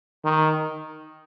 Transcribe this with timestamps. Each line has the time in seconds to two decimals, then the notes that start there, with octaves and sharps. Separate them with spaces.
0.24 D#3